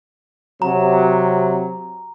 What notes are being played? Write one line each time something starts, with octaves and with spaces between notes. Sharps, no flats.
C3 F#3 A#5